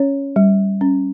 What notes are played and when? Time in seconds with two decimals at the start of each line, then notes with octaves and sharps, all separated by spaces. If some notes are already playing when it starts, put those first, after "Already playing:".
Already playing: C#4 C#5
0.36 G3
0.81 C#4